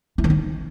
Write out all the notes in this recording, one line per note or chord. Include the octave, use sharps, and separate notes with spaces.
E4
D#3
D#4